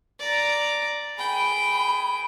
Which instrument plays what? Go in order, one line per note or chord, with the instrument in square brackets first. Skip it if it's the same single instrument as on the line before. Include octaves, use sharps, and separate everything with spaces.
[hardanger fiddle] D5 A#5
[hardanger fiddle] G#4 G5 [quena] B5